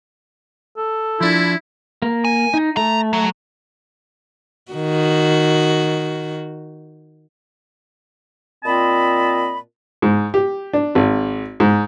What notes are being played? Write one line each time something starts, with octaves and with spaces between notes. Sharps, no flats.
A4
F3 D4 E4
A#3
G#5
D#4
A3 A#5
F#3
D#3 F#4
A#2 C4 F4 D#5 A5 B5
G#2
G4
D4
G#1
G#2